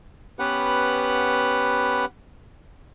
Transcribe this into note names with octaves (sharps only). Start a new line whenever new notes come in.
B3 C#4 G4 B4 F#5